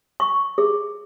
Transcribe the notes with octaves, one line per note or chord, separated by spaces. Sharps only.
C#6
G#4